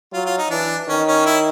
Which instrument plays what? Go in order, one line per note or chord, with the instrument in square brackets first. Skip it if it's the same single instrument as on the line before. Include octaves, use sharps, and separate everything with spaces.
[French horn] F#3 [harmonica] F4
[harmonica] F4
D#4
[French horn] E3 [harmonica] D4
[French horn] D#3 [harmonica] C#4
[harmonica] C#4
E4